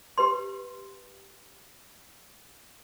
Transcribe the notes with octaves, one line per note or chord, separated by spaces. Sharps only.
G4 B4 C6